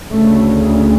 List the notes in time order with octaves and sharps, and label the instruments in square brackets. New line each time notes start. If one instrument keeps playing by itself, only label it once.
[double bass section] D2 C#3 A3